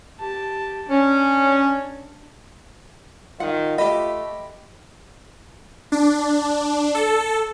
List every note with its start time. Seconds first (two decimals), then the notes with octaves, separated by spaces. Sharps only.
0.20 G4 A5
0.89 C#4 D4
3.40 D#3 F4 F#5
3.78 A3 G4 D#5 B5
5.92 D4
6.95 A4